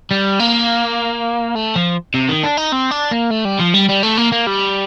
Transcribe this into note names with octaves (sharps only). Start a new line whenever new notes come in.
G3
A#3
A3
F3
C3
D#3
D4
D#4
C4
D4
A#3
A3
G3
F3
G3
G3
A3
A#3
A#3
G3